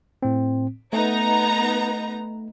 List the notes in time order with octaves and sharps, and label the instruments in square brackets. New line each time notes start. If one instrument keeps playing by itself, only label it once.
[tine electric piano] A2 C4
[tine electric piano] A3 [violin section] B3 D#4 A#5